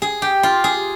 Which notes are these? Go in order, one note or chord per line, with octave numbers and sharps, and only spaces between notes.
G#4
G4
F4
G#4